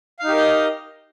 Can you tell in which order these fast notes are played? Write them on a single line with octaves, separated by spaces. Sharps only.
F5 D#4 G4 A#4 D#5